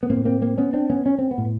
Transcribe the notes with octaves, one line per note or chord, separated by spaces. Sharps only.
B3
A2 A#3 C4
A#3 C4
A#3 C4
B3 C#4
C4 D4
B3 C#4
C#4
C4
B3
A2